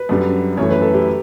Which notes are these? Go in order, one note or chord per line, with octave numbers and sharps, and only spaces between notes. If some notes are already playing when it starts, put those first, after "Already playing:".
Already playing: B4
F#2 D3 G3
F#2 E3 A3 C#5
B4
A4
G4